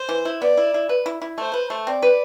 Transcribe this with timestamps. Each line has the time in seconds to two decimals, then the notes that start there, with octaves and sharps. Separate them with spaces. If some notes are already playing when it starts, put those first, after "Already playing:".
Already playing: C5
0.09 E3
0.25 E4
0.41 B3 D5
0.57 E4
0.74 E4
0.89 B4
1.06 E4
1.22 E4
1.38 A3 C5
1.54 B4
1.70 A3
1.86 C4 D5
2.02 B4